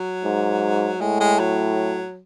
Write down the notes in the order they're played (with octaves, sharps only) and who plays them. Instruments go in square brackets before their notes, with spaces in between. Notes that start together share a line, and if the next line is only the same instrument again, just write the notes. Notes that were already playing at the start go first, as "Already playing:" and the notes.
Already playing: [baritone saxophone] F#3
[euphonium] G#2
[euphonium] A2 [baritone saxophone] G#3
[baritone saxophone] G#3
F#3